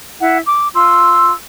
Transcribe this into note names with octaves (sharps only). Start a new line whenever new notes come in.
E4 F#5
D6
F4 C6 E6